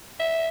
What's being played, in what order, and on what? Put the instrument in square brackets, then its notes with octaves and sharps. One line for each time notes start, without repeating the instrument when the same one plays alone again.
[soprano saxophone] E5